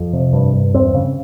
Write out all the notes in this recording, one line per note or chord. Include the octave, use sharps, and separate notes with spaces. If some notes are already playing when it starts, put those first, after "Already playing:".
Already playing: F2
C3
G2
G2
E2 C4
C#3